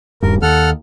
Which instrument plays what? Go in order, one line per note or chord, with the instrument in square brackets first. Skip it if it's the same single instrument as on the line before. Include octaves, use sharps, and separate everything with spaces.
[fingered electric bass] D#1 G2 [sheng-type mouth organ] A#4
[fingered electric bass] D#2 [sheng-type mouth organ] A4 F#5 F6